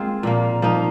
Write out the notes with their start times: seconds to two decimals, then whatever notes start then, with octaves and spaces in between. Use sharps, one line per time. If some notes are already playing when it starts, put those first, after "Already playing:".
Already playing: G#3 A#3 C4 F4
0.23 A#2 F3 A#3
0.62 F3 A#3 D#4